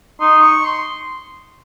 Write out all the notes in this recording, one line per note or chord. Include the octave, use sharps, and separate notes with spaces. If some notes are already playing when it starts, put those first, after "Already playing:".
D#4 C6
C#6
C6